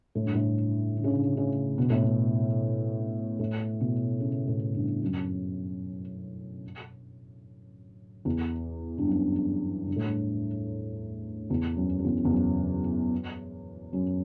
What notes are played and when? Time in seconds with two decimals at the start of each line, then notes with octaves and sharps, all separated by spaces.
0.15 A2
0.24 G2
0.34 A2
0.97 D3
1.04 C#3
1.10 D3
1.37 C#3
1.78 B2
1.90 A2
2.04 B2
3.39 A2
3.81 B2
4.20 C#3
4.48 A2
4.74 G2
5.02 F#2
8.25 E2
8.98 G2
9.07 F#2
9.87 G2
9.96 A2
10.03 G2
11.50 E2
11.76 F#2
11.99 F#2
12.04 E2
12.25 E2
12.30 F#2
13.93 F#2